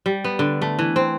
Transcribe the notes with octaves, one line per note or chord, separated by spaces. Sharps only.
G3
B3
D3
A3
E3
C4